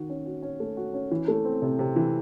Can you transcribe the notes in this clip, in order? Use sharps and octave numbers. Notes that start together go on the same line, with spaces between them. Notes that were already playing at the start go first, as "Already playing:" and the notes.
Already playing: D#3 F#4
C#4
F#4
C#4
A3
F#4
C#4
E3
A3
C4
C3
C3
E3